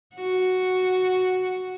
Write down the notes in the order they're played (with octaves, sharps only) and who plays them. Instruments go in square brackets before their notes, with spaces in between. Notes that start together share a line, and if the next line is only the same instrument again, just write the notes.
[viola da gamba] F#4